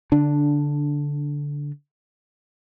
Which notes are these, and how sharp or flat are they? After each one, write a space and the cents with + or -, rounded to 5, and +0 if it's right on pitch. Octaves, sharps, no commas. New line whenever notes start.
D3 -15 D4 +0